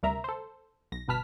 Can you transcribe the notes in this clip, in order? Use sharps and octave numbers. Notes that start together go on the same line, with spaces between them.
D2 C3 G3 A#4 E5 A#5
A4 C5
B1 A#6
G1 B2 B4 A5 F6 B6